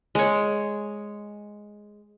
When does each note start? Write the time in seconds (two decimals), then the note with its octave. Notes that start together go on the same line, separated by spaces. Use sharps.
0.15 G#3 C#5